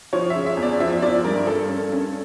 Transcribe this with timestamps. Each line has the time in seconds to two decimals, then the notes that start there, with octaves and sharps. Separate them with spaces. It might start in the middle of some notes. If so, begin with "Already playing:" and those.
0.13 F3 C#5
0.30 E5
0.35 C#3
0.46 E5
0.57 E2
0.63 D5
0.80 F3 E5
1.02 F3 D5
1.24 G2 A#4
1.47 G2 A4
1.69 C#4
1.92 C#4